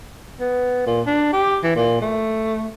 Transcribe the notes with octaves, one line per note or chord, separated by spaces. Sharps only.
B3
A#2
D4
G4
E3
A#2
A3